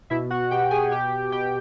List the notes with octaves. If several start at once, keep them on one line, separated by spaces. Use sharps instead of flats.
B2 E4 E5
F#4 F#5
B2 G4 G5
G#4 G#5
B2 G4 G5
B2 G4 G5